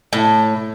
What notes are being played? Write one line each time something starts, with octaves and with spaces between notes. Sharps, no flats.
A2